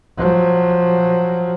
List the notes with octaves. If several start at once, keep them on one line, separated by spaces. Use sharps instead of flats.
F3 F#3